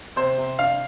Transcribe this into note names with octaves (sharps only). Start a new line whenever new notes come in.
C3 C5
C3
D4 F5